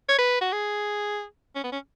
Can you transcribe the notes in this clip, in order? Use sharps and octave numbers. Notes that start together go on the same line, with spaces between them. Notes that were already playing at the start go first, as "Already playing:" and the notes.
C#5
B4
F#4
G#4
C#4
B3
C#4